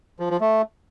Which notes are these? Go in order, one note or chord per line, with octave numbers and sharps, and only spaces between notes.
F3
F3
A3